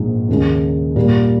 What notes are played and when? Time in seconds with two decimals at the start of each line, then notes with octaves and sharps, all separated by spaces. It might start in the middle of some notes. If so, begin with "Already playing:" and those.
Already playing: A#1 G#2 F3 A#3
0.29 D#2 C#3 G#3
0.96 A#2 G3 A#3